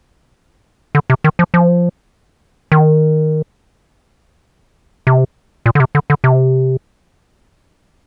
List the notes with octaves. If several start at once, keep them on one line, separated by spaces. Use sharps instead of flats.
D3
C3
D#3
F3
F3
D#3
C3
A#2
D3
C3
D3
D3
C3